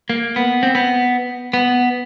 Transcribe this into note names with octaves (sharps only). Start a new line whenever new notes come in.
A#3
B3
C4
B3
B3